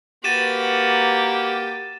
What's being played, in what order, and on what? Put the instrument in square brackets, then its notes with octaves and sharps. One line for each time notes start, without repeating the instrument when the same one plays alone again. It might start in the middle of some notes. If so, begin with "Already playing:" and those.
[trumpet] A#3 [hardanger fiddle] F#4 B4 [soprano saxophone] G4 [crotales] A6 D#7 E7